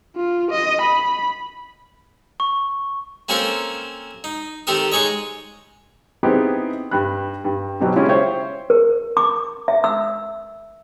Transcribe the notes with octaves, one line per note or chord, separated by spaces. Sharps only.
F4
D#5
B5
C#6
A#3 C4 C#4 A4 A#4 C5
D#4
D#3 C4 G4 A4 A#4 D#6
G#3 D#4 G#4 C#5 D#5
B3 C4 D#4 E4 G4 G#4
G2 B5 F#6
G2
B2 F#3 G3 B3 C4
C#3 G#3 C#4 E4 F4 G4
C5 C#5 E5 G5
A#4
D6
E5
E6